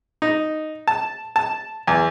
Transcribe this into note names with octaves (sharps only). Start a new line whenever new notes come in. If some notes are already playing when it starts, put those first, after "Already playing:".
D#4
A5
A5
E2